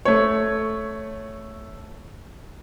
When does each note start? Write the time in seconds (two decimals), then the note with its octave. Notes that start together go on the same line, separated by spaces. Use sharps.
0.05 A3 C#5